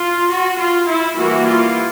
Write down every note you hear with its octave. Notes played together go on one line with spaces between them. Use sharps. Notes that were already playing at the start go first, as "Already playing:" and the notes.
Already playing: F4
F#4
F4
E4
E3 G3 A#3 F#4
F4